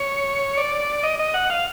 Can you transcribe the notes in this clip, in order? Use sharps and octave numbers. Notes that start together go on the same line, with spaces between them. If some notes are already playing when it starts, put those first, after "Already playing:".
Already playing: C#5
D5
D#5
D#5
F#5
F5